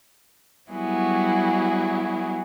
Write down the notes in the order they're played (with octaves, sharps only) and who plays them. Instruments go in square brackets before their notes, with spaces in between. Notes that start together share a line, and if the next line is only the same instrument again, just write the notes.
[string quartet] F#3 G3 B3 E4 F#4 G#4